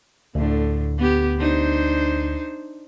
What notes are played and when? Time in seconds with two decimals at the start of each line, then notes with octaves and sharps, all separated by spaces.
0.35 D2 A2 D3
0.98 B3 G4
1.38 D4 D#4 C5